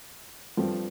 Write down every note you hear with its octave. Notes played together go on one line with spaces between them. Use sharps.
G2 F3 C4 A4